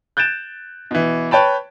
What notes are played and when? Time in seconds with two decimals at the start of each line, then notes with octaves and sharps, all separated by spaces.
0.17 F#6 G6 A6 D7 E7
0.91 B2 E3
1.31 B4 C#5 G5 A5 B5